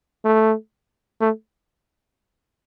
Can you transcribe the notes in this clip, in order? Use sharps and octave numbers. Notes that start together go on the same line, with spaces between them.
A3
A3